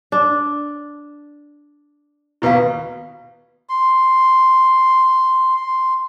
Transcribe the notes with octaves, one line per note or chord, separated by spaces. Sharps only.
D4
D#2 B2 E4 B4 F5
C6
C6